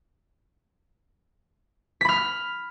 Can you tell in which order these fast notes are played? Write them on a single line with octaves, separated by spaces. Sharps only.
B6 B5 F6